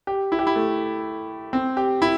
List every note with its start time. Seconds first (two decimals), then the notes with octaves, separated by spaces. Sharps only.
0.07 G4
0.32 E4
0.39 G4
0.47 E4
0.56 A3
1.53 C4
1.77 G4
2.02 E4